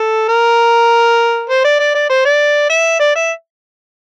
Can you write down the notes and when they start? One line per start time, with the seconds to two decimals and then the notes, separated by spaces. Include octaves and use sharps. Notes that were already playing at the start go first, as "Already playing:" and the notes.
Already playing: A4
0.29 A#4
1.50 C5
1.65 D5
1.80 D5
1.94 D5
2.10 C5
2.25 D5
2.70 E5
3.00 D5
3.15 E5